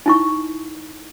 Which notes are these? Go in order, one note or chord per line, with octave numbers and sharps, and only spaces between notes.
D#4 E4 C#6